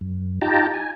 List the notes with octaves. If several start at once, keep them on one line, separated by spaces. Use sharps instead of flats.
F#2
D#4 F4 G4 G5 A5 A#5
G#5